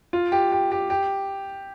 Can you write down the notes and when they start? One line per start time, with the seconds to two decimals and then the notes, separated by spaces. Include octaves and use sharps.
0.13 F4
0.32 G4
0.52 G4
0.71 G4
0.90 G4